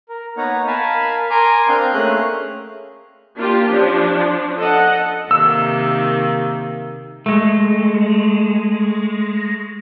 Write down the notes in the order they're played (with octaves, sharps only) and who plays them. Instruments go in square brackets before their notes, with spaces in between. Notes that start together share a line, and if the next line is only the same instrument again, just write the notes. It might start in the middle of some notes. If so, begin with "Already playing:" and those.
[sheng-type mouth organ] A#4
A#3 B3 D#4 C#5 F#5 A#5
A#4 F5 G#5 A5 B5
A#4 G#5 A#5 C6 D6
C4 D4 F5 D#6 G6
A3 A#3 C#4 G#4 F5 F#6
[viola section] A#3 D4 F4 G4
F3 C#4 D4
A4 D#5 F#5
[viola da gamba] C3 D#3 [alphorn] A#3 [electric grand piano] E6
[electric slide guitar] G#3 A3